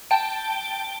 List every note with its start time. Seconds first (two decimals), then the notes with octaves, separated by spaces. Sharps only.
0.11 G5 A5 D7